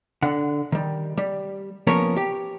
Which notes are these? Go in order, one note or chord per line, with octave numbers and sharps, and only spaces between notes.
D3 F#5
D#3 G3
G3
F3 A#3 B3 C#4 A#4 C#5
G4